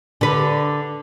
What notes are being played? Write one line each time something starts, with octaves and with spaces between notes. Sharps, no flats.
D3 B4